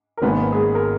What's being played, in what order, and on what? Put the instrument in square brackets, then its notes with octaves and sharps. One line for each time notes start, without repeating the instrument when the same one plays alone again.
[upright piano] A#4
[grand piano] G#1 G#2 D#3 A#3 C#4 [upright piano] B3 B4
[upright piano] G#3 G#4
A#4